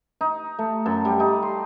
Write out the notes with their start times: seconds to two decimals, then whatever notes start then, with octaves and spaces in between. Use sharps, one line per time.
0.21 D#4
0.59 A3
0.86 F#2
1.05 G3
1.20 D#4
1.43 C6